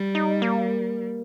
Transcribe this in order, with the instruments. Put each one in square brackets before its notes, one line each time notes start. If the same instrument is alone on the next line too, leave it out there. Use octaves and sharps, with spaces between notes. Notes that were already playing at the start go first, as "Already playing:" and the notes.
Already playing: [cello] G3
[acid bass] D#4
A#3